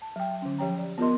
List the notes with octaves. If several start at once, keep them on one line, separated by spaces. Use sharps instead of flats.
A5
F#3 G5
D3 C#4
F3 G4 C#5 G5 A#5
D5
B3 F4 G4 A#4 D#5 C6